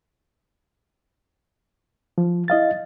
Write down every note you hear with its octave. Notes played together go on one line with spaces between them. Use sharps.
F3
E4 D#5 F5 A6